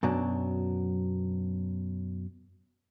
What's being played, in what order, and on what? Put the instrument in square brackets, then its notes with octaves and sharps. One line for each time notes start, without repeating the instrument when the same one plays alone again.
[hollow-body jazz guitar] F#2 B2 F#3 D4